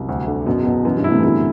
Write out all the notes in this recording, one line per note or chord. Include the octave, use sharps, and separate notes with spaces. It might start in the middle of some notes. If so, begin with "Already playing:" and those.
Already playing: C2 F#2
D2
D3
F#2 B2
E2
B2
E2
F#2 E3
G2 B2
E4
A2 C3
E3
B2 D3 E4